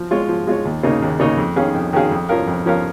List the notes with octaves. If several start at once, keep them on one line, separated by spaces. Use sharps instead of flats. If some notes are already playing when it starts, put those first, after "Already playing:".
Already playing: F3
G#3 F4 C#5
F3
G#3 F4 C#5
D#2
C#3 A#3 D#4 C#5
D#2
C#3 A#3 D#4 C#5
F2
D#3 C#4 G#4 F5
F2
D#3 C#4 G#4 F5
F2
F3 C#4 A#4 F5
F2
F3 C#4 A#4 F5